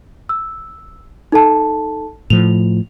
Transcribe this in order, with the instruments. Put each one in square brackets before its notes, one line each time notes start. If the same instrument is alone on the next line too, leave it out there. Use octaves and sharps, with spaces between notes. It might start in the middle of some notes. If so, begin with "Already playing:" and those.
[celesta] E6
D#4 A4 A5
[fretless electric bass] A2 F3 [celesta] F7